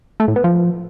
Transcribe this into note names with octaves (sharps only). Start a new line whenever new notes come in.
A3
A2
B3
F3